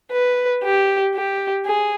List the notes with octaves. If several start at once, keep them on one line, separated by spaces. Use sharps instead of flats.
B4
G4
G4
G#4